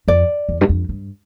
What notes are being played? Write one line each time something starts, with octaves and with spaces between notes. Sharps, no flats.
F2 D5
E2
G2
F2
G2